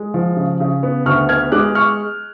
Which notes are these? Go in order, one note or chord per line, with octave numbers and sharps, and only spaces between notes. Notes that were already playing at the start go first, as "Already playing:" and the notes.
Already playing: G#3
F3
C#3
C#3
B3
D2 C#6 F6
B3 F6 G#6
G#3 D6 F#6
C#6 F6